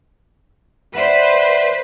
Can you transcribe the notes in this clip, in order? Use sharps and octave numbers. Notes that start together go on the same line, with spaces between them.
B4 C5 D5 E5 F#5